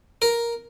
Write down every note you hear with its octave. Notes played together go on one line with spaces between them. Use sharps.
A#4